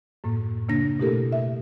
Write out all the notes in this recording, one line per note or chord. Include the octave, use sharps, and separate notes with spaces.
F#2 A2 A#3
C#3 A#3 D4 A#6
B2 A3 E4 G4 A4 A#4
E5